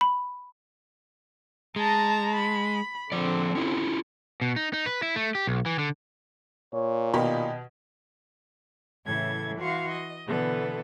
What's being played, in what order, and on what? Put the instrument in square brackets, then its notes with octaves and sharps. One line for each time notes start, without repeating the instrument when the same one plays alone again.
[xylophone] B5
[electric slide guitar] G#3 [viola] A5 A#5
[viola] B5
[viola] D3 C4 [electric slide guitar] F3 D5
[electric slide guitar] C#4 E4 F4
[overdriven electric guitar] B2
D#4
D#4
B4
E4
A3
G4
B1
E3
D3
[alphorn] A#2 [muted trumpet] C#5
[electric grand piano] B2 [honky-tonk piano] D#3 G4 B5 [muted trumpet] D#5
[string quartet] A2 C#3 E3 A4 G#6
E3 F#4 F5 C6 C#6
D#5
B2 D3 E3 B3 A4 B4